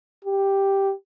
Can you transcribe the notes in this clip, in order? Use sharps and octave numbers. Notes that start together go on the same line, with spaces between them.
G4